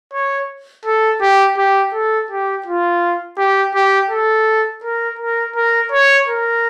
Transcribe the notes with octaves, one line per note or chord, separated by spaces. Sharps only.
C#5
A4
G4
G4
A4
G4
F4
G4
G4
A4
A#4
A#4
A#4
C#5
A#4